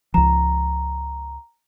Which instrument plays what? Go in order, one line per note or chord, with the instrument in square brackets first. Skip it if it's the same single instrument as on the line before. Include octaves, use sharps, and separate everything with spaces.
[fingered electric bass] C#2 F3 [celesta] A#5